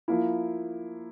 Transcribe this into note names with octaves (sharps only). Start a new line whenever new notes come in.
F3 A#3 E4